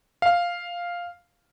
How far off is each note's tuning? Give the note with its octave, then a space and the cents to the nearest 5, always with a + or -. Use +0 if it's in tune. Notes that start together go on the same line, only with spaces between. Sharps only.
F5 +0